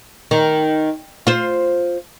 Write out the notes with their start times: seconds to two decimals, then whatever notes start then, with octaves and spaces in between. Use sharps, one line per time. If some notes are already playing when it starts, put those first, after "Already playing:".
0.31 D#3
1.27 F4 C5